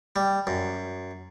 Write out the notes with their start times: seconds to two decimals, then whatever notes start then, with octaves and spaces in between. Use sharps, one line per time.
0.16 G3
0.47 F#2